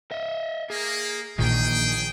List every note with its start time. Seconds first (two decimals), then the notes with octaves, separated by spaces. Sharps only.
0.11 D#5 E5
0.70 A#3 G#4
1.38 A#1 A#2 D#3 E3 G#4 G5